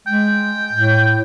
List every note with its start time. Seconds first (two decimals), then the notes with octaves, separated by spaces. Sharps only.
0.07 G#3 G5
0.73 A2